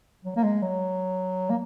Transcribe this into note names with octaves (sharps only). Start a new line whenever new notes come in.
F#3
A#3
G#3
F#3
A#3